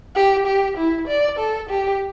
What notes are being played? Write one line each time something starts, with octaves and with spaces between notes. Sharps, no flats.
G4
G4
E4
D5
A4
G4